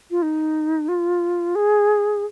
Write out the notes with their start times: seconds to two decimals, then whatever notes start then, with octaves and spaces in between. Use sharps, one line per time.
0.11 F4
0.22 D#4
0.89 F4
1.55 G#4